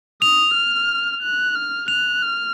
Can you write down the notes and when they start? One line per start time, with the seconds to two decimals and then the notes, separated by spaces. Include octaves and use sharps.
0.22 D#6 F7
0.55 F6
1.22 F#6
1.55 F6
1.88 F#6 F7
2.22 F6